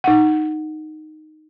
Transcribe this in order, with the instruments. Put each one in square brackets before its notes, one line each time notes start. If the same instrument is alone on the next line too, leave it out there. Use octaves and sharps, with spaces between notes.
[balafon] D#4 F#5